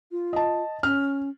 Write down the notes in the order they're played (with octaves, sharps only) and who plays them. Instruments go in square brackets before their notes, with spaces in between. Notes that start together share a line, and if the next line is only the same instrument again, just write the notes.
[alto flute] F4
[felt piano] D#5 A5
[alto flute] C#4 [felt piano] F6